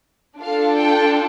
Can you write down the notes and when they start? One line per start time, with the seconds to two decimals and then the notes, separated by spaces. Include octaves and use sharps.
0.40 D4 F4 A4 F5
0.76 G5